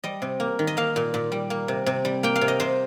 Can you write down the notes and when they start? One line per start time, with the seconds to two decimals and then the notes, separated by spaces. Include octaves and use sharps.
0.04 G3 D#5
0.22 C3
0.40 A#3
0.59 D#3
0.67 D#5
0.77 A#3 F5
0.96 A#2
1.14 A#2
1.32 G3
1.50 A#3
1.68 C3
1.86 C3
2.05 G3
2.23 A#3 G5
2.36 F5
2.41 C3
2.48 D#5
2.60 C3 C5